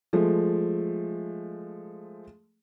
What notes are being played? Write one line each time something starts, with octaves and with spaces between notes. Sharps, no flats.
F3 G#3 A3